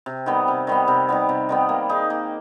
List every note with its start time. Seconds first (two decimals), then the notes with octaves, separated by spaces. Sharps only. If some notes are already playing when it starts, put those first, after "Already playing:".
0.06 C3
0.26 D#3 G3 B3
0.48 C3
0.67 D#3 G3 B3
0.88 C3
1.09 D#3 G3 B3
1.29 C3
1.49 D#3 G3 B3
1.69 A#3
1.89 D#4 G#4
2.10 A#3